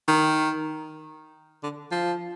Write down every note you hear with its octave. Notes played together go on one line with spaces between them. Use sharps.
D#3
D3
F3